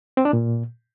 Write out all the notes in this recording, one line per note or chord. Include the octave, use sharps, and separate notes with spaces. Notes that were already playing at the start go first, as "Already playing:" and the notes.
C4
D4
A#2